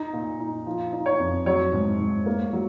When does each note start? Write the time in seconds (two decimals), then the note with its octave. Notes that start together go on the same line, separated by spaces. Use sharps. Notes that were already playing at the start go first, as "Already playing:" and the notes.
Already playing: D#4
0.13 A#2
0.40 D#4
0.66 F3
0.92 D#4
1.06 C#5
1.20 F2
1.46 F#3 C#5
1.73 G#2
2.00 G#2
2.26 A#3
2.53 F#3